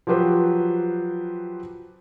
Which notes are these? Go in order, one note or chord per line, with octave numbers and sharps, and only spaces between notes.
F3 F#3 G4 B4 C5